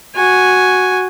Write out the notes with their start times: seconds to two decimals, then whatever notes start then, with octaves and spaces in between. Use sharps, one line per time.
0.16 F#4 G#5